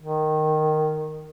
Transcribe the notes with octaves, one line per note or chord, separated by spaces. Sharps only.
D#3